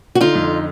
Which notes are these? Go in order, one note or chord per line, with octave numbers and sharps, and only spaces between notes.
F#4
D3 D#4 F4
F2